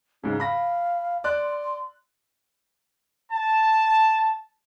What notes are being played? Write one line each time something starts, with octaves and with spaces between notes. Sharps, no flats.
G#2 C#3 D#4
F5 B5 A#6
D5 C6 F#6
A5